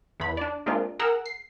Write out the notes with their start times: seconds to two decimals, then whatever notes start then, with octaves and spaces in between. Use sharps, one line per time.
0.20 E2 B5
0.37 D4 D5
0.66 G#3 A#3 C4 D4 F4
0.99 G#4 A#4 F#5 E6
1.26 C7